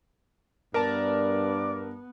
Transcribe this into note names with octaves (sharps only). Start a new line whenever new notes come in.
G2 B3 A#4 D5 A5